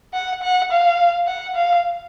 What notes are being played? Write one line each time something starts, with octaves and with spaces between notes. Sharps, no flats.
F#5
F#5
F5
F#5
F5